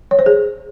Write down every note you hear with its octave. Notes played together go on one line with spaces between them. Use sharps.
C#5
C5
G#4